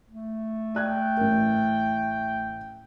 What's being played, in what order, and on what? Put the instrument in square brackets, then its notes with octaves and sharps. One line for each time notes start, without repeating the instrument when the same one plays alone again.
[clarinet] A3
[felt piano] D5 F#6 G#6 [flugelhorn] G5
[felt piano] A1 A#4